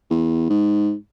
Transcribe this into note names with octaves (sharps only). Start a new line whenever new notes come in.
E2
G#2